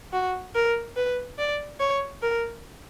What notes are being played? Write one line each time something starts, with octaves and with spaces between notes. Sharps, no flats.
F#4
A#4
B4
D5
C#5
A#4